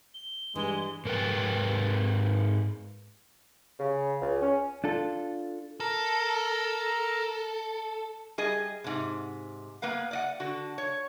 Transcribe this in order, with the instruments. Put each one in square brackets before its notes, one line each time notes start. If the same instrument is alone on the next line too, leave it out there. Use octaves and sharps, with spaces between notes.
[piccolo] G7
[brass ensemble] G2 [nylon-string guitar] E3 [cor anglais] G#3
[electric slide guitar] G#2 A#4 B4 G5
[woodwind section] C#3
C#2
C#4
[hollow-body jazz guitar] D4 F4 A4
[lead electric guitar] A4 [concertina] A#4 A#5
[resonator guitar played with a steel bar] G3 G#4 D#5
G#2 C3
A#3 B3 B4 F5
D5 D#5 F#5
D3 F#4
C#5